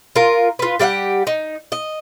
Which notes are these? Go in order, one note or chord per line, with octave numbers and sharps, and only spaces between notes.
F4 A#4
F4 B4
G3 G4 F5 F#5
D#4
D#5